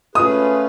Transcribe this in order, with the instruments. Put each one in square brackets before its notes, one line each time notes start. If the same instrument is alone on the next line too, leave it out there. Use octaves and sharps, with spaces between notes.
[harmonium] A3 C#4 F4 G#4 B4 [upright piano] D#6